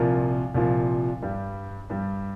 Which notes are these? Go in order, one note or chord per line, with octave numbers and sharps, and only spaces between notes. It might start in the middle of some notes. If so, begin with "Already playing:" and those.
Already playing: C2 A#2 F3 A#4
C2 A#2 F3
G2 G3
G2 G3